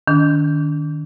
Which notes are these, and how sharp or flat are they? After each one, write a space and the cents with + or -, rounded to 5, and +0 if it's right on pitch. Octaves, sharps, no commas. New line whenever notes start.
D#3 -20 D4 -40